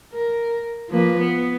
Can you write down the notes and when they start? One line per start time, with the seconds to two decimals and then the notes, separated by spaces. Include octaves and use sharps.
0.13 A#4
0.89 F3 A#3 B4
1.19 B3